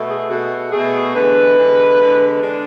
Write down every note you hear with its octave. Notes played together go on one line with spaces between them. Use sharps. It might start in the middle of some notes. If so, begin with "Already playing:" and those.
Already playing: B2 A3
G#4
B2 A3 F#4
B2 A3 G#4
E2 D3 G#3 B4
E2 D3 G#3
E2 D3 G#3
D3 G#3 D4